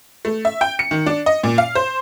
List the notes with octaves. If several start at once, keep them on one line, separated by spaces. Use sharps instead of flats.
A3
E5
G5
C#7
D#3
D4
D#5
A#2
F5
C5